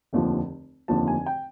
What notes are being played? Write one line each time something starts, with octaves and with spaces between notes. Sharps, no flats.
F1 D#2 D3 F3
F1 D#2 D3 F3 A5
G#5
G5